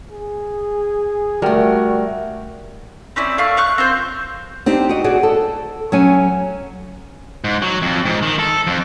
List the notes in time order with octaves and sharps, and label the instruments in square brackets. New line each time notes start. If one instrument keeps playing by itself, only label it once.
[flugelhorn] G#4
[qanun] G3 A3 [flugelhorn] F#4 [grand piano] A#4 [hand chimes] D5 G5
[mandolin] C4 C#4 E4 D5
A3 F5 C#6 F6
F5 C#6 F#6
C4 F4 C5
[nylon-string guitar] C4 D4 D#4 G4
F#4 D#5
F#4 G#4 D5
A4
F#3 C#4 G#5
[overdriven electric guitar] G#2
F#3
F2
G#2
D#3
A4
F2